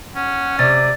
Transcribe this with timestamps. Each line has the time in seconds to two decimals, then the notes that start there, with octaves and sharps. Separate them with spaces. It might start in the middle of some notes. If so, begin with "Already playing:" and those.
0.16 C#4 F#5
0.59 C3 D5 A6